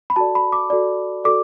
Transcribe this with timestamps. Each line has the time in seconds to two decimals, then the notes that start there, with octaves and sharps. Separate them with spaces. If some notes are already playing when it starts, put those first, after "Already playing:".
0.10 B5
0.16 F#4 A4 D5 A5
0.35 B5
0.52 D6
0.70 F#4 A4 D5
1.24 F#4 A4 D5 D6